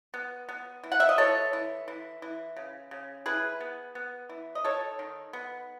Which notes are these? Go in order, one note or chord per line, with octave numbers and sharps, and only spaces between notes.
B3
B3
E3
F#5
E5
D#5
E3 A4 C#5
E3
E3
E3
C#3
C#3
E3 G#4 B4
B3
B3
E3
D#5
D#3 A4 C#5
D#3
B3